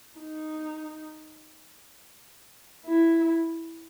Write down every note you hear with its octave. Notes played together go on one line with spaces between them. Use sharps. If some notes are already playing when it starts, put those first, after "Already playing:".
D#4
E4